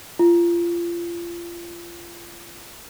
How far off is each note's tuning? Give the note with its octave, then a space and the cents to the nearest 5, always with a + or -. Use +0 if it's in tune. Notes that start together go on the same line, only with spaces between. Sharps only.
F4 -25